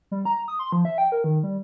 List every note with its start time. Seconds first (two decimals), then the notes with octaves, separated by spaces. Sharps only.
0.11 G3
0.25 A#5
0.48 D#6
0.59 C6
0.72 F3
0.85 E5
0.98 G5
1.12 A#4
1.24 D#3
1.43 G3